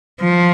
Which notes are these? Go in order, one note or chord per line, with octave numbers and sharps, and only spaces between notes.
F3